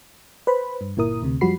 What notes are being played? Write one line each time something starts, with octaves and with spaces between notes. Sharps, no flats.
B4 C5 B5
G2
G1 A#2 E4 A#4 D#6
D2 C3
F#2 F3 G3 F#4 B5 C7